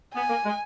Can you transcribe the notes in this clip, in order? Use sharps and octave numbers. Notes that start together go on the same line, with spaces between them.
B3 G#5
A#3
G#3